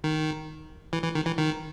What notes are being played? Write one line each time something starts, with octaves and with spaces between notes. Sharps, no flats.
D#3
E3
E3
D#3
E3
D#3